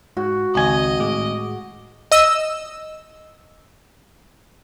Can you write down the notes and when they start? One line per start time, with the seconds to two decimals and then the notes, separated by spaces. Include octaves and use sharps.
0.17 G#2 F#4
0.55 G#1 C#2 D#5 G#5
1.00 A2 G#3 D6
2.12 D#5 E6